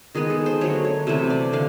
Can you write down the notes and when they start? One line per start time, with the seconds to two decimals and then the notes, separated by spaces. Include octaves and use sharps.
0.15 D#3 G#3 B3 G#4
0.30 A4
0.46 C5
0.61 D3 F#3 A3 C#5
0.85 C#5
1.07 C3 E3 A3 C5
1.30 D5
1.53 D3 F5